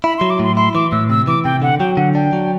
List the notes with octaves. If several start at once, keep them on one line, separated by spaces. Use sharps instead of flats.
E4 B5
F#3 C6
D6
A2 C6
E4 C6
E3 D6
A2 E6
C3 E6
E3 D6
C3 G5
D3 F#5
F#3 G5
D3 F#5
D4 G5
F#3